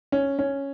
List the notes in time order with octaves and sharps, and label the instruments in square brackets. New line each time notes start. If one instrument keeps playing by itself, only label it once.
[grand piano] C#4
C#4